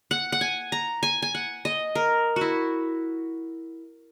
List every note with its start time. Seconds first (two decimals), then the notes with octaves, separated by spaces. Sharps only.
0.11 F#5
0.32 F#5
0.41 G#5
0.72 A#5
1.03 G#5
1.22 G#5
1.35 F#5
1.65 D#5
1.95 A#4
2.36 E4 F#4